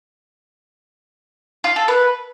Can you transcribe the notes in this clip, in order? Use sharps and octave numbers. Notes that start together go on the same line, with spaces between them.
F4
A4
B4